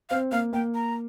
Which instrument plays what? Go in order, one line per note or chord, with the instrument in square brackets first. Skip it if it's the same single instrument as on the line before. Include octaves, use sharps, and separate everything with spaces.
[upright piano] C4 [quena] F5
[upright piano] A#3 [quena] F5
[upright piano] A#3 [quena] G5
[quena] A#5